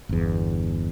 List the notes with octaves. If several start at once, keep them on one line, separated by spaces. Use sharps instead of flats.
G1 E2